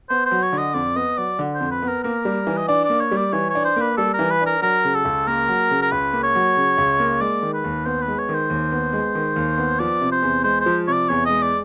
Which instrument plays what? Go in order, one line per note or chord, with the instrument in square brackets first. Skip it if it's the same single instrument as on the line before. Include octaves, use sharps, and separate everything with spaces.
[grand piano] B3 [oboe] C5
[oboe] C5
[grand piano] F#3
[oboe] C#5
[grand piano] D3
[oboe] D#5
[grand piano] F2 [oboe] D5
[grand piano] B3 [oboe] D#5
[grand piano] F#3 [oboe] D5
[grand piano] D3
[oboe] C5
[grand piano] F2
[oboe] B4
[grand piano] B3
[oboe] A#4
[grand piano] A#3 [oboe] A#4
[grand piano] G3
E3
[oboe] D#5
[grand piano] D4 [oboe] D5
[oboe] D5
[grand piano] A#3
[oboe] C#5
[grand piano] G3
[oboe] D5
[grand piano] E3 [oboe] C#5
[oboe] C#5
[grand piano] D4
[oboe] C5
[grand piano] A#3 [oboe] B4
[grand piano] G3 [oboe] A4
[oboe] A#4
[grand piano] E3
[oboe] B4
[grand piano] D4
[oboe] A#4
[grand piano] F#3 [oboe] A#4
[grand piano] C#3
[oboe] A4
[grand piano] C#2
[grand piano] A#3 [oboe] A#4
[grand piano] F#3
C#3
[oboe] A#4
[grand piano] C#2 [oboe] B4
[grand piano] A#3
[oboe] C#5
[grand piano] F#3
C#3
C#2
A#3
[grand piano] G#3 [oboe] D5
[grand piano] D#3
[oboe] B4
[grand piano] D#2
[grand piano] B3 [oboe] C5
[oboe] B4
[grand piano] G#3
[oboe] C#5
[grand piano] D#3
[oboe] C5
[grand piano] D#2
B3
G#3
D#3
D#2
B3
[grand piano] F3 [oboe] D5
[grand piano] C3
[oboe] C5
[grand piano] E2
[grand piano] G#3 [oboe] C5
[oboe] C5
[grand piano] F3
[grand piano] C3 [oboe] C#5
[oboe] D5
[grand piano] E2 [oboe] C#5
[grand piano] G#3 [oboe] D#5
[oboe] D5